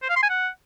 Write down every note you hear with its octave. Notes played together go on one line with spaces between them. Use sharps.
C5
F5
C6
G#5
F#5